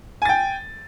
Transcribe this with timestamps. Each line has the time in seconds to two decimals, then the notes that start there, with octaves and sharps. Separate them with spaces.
0.22 G#5
0.25 A6
0.29 G5